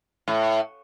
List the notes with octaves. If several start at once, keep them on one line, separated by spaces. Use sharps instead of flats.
A2